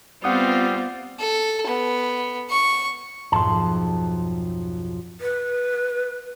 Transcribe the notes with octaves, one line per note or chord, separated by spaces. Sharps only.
G3 B3 C4 F4 F#5 D#6
A4
B3
C#6
B1 F2 G#2 A5 C6
B4